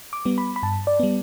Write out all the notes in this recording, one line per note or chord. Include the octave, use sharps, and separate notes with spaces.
D6
G3 B3
B5
B5
G2 A5
D5
G3 B3